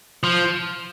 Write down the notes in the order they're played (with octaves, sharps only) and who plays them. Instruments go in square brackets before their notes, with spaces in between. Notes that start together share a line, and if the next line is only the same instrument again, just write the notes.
[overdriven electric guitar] F3